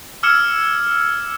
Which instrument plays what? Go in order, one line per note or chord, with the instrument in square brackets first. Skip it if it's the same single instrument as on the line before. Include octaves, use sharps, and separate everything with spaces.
[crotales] D6 E6 F6 G#6 C#7 E7